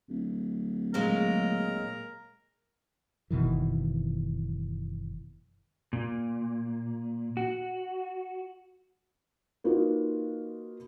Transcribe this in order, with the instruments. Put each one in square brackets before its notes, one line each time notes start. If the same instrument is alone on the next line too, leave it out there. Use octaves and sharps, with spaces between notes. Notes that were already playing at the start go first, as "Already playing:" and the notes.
[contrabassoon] D1
[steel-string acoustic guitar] A#2 F#3 G#3 [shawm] A#4
[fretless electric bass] F#1 B2 D#3 E3
[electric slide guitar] A#2
F#4
[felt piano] A#3 D#4 F4 F#4 B4